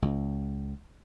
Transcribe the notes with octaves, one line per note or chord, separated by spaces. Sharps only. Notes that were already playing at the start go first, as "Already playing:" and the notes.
C#2